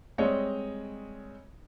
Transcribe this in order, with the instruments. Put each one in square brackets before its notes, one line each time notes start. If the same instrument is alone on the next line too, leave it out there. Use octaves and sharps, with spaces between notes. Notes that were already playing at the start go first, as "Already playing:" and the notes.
[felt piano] G3 G#3 C4 C#5 D#5